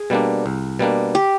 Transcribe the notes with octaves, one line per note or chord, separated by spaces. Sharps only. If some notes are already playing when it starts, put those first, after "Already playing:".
Already playing: G#4
B2 G3 A#3 D4
C2
B2 G3 A#3 D4
G4